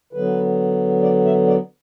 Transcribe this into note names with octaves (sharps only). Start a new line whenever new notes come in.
D3 F#3 B3 B4
D5
E5
D5